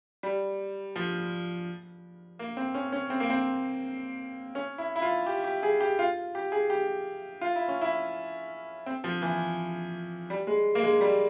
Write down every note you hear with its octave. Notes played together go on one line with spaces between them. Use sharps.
G3
F3
A#3
C4
C#4
C#4
C4
A#3
C4
C#4
E4
E4
F4
G4
G4
G#4
G4
F4
G4
G#4
G4
F4
E4
C#4
E4
C4
F3
E3
G3
G#3
A#3
G#3
G3